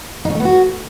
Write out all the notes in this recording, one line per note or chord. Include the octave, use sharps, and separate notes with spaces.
D#4
C#4
A3
B3
F#4